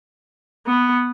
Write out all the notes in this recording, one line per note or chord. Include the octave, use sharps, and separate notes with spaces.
B3